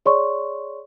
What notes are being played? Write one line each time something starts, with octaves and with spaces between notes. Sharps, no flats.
G#4 C#5 D5 C6 C#6